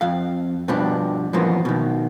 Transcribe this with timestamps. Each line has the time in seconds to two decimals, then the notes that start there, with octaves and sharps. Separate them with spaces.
0.01 F2 F5
0.68 G2 B2 F3 B3 D4
1.33 F#2 A#2 E3 F3 A#3 B3
1.65 B2 D#3